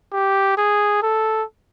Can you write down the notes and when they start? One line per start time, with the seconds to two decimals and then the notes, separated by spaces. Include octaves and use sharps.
0.13 G4
0.57 G#4
1.03 A4